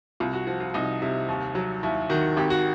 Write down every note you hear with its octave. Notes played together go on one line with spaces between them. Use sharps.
C2 F4
F#4
F3 F#4
F4
C2 D#4
C3 E4
D#2
F#3
D#2 E4
D#3 F#4
G#1 G4
F#4